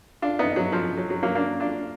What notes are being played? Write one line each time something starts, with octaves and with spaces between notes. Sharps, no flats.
D4 F4
B3 D#4
F#3
F3
F#3
F#3
F#3 A#3
A#3 D4
D4 F4